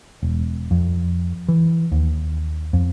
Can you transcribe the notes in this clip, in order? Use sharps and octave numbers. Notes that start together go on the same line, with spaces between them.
E1
F2
E3
D#2
F2